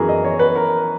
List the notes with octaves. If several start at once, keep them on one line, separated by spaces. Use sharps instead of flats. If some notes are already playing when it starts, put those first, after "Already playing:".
Already playing: F#2 E3 B3 F#4 G#4 A#4
D#5
C#5
B4
A#4